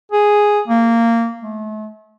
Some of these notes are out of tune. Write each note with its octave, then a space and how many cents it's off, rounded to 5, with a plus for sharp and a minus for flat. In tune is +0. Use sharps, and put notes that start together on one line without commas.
G#4 +0
A#3 -15
A3 -40